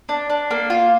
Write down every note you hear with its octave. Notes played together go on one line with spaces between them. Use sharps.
D4
D4
A#3
F4